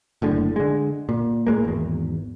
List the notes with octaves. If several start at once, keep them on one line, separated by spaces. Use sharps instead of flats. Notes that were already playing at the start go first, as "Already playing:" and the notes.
F#1 A2 D3
D3 G#3
A#2
A2 G#3 A#3
G#1 E2